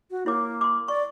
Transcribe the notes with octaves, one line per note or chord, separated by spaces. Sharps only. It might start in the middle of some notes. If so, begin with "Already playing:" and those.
F#4
A#3 E4 C#5 D6
C6 D6
D5 C#6